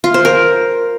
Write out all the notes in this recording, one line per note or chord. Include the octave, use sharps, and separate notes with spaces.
F4
C5
A#4